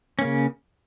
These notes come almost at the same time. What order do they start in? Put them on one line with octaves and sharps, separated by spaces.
C#4 A#3 C#3